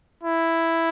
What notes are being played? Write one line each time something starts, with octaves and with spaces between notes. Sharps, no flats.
E4